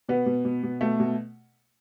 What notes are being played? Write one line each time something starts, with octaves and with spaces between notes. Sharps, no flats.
B2 B3
B2
B2
B2
B2 A3
B2